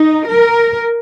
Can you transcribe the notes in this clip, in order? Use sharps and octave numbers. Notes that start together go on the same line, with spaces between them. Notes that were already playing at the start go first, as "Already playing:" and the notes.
Already playing: D#4
A#4